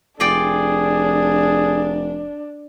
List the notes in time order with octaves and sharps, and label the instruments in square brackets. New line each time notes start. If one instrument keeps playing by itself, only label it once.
[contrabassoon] F1 [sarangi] D4 [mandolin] F4 D5 G5 [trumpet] G#4